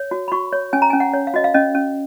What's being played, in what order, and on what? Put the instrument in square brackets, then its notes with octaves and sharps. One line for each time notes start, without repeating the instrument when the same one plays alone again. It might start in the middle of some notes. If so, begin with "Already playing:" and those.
Already playing: [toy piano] C#5
F#4
B5
F#4 C#6
C#5
C#4 G#5
A#5
G#5
C#4
F#5
C#5
F5
F#4 D#5
F5
C#4 D#5
C#4